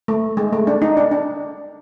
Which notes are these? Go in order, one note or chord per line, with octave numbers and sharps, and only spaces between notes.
A3
G#3
A3
D4
D#4
D4
D4